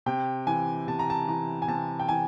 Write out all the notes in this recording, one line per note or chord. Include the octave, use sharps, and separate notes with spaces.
C3 G5
E3 G#5
C3 A5
A#5
A5
E3 A#5
G#5
C3 A5
G5
E3 G#5